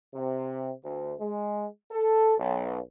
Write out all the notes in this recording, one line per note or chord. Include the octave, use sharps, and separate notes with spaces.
C3
D2
G#3
A4
B1